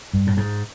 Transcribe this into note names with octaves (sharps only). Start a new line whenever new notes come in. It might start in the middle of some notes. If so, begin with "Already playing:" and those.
G2
A2
G#2